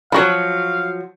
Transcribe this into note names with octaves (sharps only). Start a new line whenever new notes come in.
F3 F#3 F#4 F5 B5